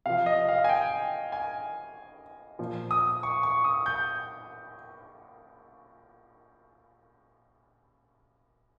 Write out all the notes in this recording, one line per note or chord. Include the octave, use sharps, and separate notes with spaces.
C3 F3 F5
D#5
F5
G#5
G5
G#5
A#2 F3
D#6
C#6
C#6
D#6
G6